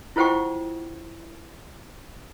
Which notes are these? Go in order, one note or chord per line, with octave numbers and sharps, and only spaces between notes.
E4 F4 C5 F#5 G5 C#6